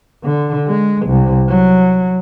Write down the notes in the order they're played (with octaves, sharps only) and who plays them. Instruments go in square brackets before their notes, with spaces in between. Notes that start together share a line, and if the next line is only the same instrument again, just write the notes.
[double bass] D3
G#3
C2
F#3